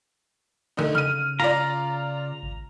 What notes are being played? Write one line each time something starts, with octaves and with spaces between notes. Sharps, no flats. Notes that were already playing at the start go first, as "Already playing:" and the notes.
D3 A3 D#4
C#3 F6 D#7
F4 D5 A#5
G#1